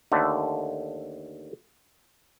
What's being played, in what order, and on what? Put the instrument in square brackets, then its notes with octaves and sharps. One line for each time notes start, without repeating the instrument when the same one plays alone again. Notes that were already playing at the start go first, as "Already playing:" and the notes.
[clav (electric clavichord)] D#2 D3 A3